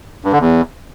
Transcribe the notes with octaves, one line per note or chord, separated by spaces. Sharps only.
G2
D3
E2